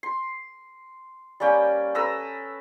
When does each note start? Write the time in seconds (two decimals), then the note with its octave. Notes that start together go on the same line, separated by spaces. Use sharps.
0.03 C6
1.40 G3 A#3 C#4 G5
1.95 A4 B4 A#5 E6